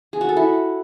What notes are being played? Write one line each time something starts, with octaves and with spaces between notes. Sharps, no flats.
G#4
F#4
A4
E4